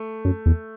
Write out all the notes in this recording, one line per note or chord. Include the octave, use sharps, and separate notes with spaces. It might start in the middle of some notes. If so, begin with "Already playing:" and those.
Already playing: A3
F#2
E2